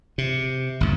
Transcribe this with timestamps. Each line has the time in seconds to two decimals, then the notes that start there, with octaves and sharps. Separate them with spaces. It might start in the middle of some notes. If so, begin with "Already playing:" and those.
0.18 C3
0.81 G1 D#2